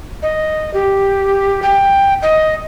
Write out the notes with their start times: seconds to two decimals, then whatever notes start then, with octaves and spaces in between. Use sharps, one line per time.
0.22 D#5
0.74 G4
1.62 G5
2.22 D#5